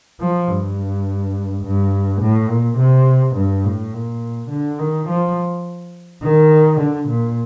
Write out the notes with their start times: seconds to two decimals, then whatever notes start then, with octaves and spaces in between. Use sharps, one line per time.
0.20 F3
0.48 G2
1.63 G2
2.21 A2
2.49 A#2
2.78 C3
3.36 G2
3.64 A2
3.94 A#2
4.50 D3
4.79 D#3
5.08 F3
6.23 D#3
6.80 D3
7.08 A#2